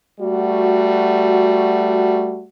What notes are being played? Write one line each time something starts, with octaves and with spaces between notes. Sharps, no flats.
G3 A3 F#4